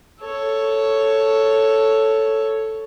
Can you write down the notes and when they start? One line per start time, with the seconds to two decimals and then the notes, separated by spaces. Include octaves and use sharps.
0.20 A4 C#5